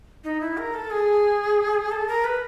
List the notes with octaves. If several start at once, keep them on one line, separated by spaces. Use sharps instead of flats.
D#4
E4
A#4
A4
G#4
A4
A#4
B4